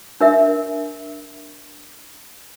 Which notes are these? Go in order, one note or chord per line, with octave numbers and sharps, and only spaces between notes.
D4 A#4 E5